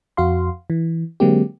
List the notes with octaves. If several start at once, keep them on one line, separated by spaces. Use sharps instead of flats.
F2 F#4 F5 C6
E3
D3 F#3 G#3 A#3 C4 G4